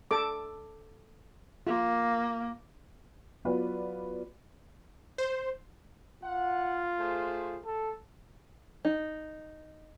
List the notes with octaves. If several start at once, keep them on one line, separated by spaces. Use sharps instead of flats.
A4 D6
A#3 F4
F#3 B3 F4 F#4 B4 D5
C5
F4 F#5
A3 G#4 C5
A4
D#4